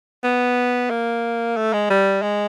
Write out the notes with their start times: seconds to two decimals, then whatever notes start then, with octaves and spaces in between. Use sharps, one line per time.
0.23 B3
0.90 A#3
1.56 A3
1.73 G#3
1.90 G3
2.22 G#3